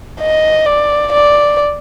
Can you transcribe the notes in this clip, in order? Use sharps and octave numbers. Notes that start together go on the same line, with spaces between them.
D#5
D5
D5